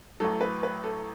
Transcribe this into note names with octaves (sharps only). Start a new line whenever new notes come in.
A1 A2 F#3 A4
B4
B4
A4